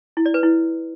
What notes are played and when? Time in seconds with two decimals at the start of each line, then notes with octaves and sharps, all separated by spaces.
0.17 E4
0.26 D5
0.34 B4
0.43 E4